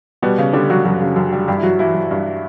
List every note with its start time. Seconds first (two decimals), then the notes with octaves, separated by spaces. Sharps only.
0.22 B2 G3 B3
0.38 C#3
0.53 D3 G3 D4
0.70 F#3 G3 F#4
0.85 F#2 F#3 F#4
1.02 C#3
1.16 F#2
1.33 G3
1.48 G2 G3 G4
1.57 E4
1.63 F#3 F#4
1.79 E3 F#3 E4
1.94 F#3
2.11 G2